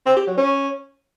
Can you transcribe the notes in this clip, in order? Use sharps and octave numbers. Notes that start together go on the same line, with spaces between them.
C4
G4
F#3
C#4